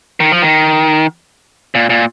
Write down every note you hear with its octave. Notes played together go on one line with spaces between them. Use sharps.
D#3
F3
D#3
A#2
A#2